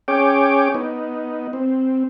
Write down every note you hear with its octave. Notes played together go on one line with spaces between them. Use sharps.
C#4 G#4 C#5 G5 D6
B3 D#4
C4